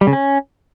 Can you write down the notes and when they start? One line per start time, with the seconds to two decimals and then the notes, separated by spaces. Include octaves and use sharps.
0.01 G3
0.07 C#3
0.13 C#4